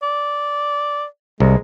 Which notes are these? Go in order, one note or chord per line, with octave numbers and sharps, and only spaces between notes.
D5
C2 G#3